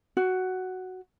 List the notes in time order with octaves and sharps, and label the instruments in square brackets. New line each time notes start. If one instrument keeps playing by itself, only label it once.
[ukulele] F#4